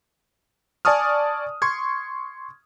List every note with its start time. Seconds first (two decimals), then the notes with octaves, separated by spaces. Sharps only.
0.85 D5 G#5 A5 C#6 D#6 F6
1.62 C6 C#6 G#6